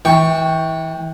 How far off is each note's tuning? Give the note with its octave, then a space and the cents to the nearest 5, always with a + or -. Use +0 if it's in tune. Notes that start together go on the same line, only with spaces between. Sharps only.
E3 -25 G5 +0 C#6 +0